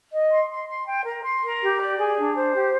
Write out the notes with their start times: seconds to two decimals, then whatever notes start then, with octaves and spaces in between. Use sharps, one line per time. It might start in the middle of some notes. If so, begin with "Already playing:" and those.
0.11 D#5
0.30 C6
0.49 C6
0.67 C6
0.85 G5
1.05 A#4
1.23 C6
1.42 A#4
1.61 G4
1.78 D5
1.97 G#4
2.16 D4
2.35 C5
2.53 G4